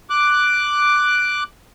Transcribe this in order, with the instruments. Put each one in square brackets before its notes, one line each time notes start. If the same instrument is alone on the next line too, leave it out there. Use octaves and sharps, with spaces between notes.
[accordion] D6 F#6